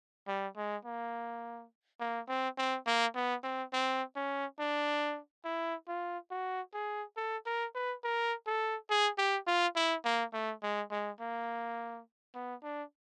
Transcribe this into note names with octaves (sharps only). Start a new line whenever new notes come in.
G3
G#3
A#3
A#3
C4
C4
A#3
B3
C4
C4
C#4
D4
E4
F4
F#4
G#4
A4
A#4
B4
A#4
A4
G#4
G4
F4
E4
A#3
A3
G#3
G#3
A#3
B3
D4